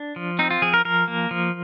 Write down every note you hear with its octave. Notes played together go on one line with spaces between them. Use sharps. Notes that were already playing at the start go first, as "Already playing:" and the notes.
Already playing: D4
F3
C4 D#4
F4
F3 G#4
A#4
F3 A#4
A#3
F3